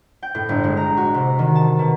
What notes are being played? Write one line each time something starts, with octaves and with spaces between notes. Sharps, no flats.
G5
A2
G1
G#3
A#5
F#4
C3
D#3
A5
B2